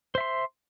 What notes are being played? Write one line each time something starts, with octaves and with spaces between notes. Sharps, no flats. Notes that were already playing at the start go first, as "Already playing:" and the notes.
C5 E5 C6